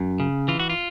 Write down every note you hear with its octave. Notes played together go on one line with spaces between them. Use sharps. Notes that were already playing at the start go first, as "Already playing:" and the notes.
Already playing: F#2
C#3
E3 F4
F#4
F4